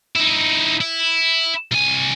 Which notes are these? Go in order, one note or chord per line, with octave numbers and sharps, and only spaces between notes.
D#4 E4
E4
C2 G#5